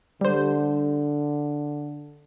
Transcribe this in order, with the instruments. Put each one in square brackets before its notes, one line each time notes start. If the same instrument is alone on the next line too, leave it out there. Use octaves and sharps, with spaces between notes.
[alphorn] D3 [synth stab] G3 C5